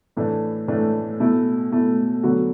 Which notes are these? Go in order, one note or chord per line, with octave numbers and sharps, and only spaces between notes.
A2 E3 A3 D4
A2 E3 A3 D4
B2 A3 E4
B2 A3 E4
D3 F#3 B3 F#4